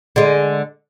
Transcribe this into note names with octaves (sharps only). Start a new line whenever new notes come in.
D3 G#3